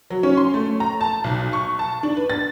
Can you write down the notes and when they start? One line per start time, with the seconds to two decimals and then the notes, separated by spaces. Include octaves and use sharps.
0.10 F#3
0.23 C#4
0.37 C6
0.54 A3
0.80 A#5
1.01 A5
1.24 B1
1.53 C#6
1.79 A5
2.03 D4
2.17 B4
2.30 A6